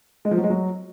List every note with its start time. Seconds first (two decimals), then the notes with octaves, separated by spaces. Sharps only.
0.25 G#3
0.31 F3
0.37 F#3
0.44 G#3
0.50 F#3